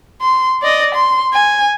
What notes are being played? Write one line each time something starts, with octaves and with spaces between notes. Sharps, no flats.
C6
D5 D#5
C6
G#5